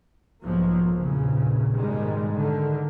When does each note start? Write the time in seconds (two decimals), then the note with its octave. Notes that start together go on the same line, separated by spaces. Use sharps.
0.43 B1 G#2 F3 F#3 A#3
0.93 A#1 E2 A#2 C#3
1.74 G#2 B2 D#3 G3 G#3
2.32 D3 D#3